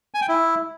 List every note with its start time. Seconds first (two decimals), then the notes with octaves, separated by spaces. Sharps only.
0.14 G#5
0.22 G5
0.29 E4